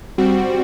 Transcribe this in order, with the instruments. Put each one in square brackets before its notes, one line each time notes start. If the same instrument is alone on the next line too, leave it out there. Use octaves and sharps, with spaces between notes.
[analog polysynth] G3 C4 F#4